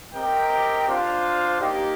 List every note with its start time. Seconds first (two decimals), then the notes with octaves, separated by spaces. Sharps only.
0.14 C4 G4 A#4 D#5 G5
0.87 D4 F4 C5 F5
1.60 A#3 D#4 G4